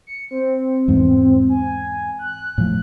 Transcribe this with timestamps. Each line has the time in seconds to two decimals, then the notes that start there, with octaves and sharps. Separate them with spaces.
0.07 C#7
0.31 C4
0.88 E2 G#2
1.50 G#5
2.19 F#6
2.58 A2 F3